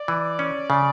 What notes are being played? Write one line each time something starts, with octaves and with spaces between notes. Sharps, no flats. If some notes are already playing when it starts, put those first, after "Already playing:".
Already playing: D5
E3
C#4
C#3